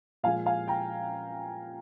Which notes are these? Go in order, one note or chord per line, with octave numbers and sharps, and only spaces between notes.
A#2 F3 G#3 F5 G#5
F5 G#5
G5 A#5